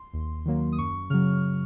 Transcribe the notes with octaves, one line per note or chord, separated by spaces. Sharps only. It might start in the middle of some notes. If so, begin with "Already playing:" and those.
Already playing: C6
D#2
D#3 F#3 A#3
D#6
F#2 C#6
C#3 F#3 F6